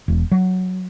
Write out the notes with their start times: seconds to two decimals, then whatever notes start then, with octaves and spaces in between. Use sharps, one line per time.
0.08 E1
0.32 F#3